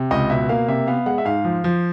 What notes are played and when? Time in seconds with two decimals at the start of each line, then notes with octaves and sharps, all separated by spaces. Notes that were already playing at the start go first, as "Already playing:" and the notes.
Already playing: C3
0.11 C#2 D#5
0.30 B2 E5
0.49 A#3 F5
0.68 C3 E5
0.87 B3 F5
1.06 G#3 F#5
1.18 E5
1.25 G#2 F5
1.45 F3
1.64 F3